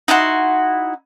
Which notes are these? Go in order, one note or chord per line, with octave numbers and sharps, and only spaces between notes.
D#4 E4 F#4 C6